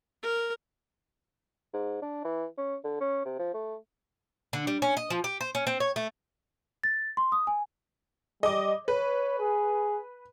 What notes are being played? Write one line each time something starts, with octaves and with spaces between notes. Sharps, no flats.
A#4
G#2
D4
E3
C#4
D3
C#4
C3
F3
A3
D3
G3
C#4
D#5
F3
G4
C5
C#4
C4
C#5
A3
A6
C6
D#6
G#5
G3 D#5 D6
B4 C#5
G#4